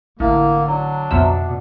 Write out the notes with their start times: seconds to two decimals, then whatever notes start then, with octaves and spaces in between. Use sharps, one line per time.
0.20 A1 D3 A#3
0.67 F#3 D4
1.11 B1 F2 B2 E5